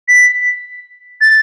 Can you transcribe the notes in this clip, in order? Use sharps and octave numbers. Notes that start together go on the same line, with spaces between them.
B6
A6